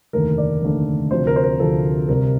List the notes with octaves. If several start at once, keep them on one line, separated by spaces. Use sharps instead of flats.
F1 D#2 D3 A3 A#4
D5
F1 D#2 D3 A3
D2 C3 F3 C5
A#4
C5
A#4
D2 C3 F3 A4
C2 C3 G3 A#4